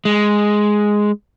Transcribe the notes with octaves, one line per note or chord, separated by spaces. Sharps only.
G#3